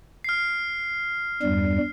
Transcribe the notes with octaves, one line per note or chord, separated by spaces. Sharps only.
F6 C7
E2 G2 G3